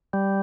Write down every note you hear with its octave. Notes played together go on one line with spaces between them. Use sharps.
G3